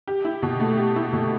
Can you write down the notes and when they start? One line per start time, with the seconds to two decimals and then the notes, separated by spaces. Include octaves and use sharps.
0.07 G4
0.25 E4
0.42 B2
0.60 A3
0.78 G4
0.96 E4
1.13 B2